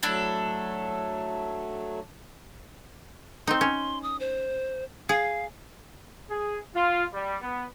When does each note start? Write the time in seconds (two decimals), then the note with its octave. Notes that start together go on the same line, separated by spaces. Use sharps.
0.03 F#3 A3 D4 E4 A4
3.47 C4 D#4 C6
3.61 C#4
4.03 D#6
4.20 C5
5.09 G#4 F5
6.29 G#4
6.74 F4
7.13 G3
7.41 B3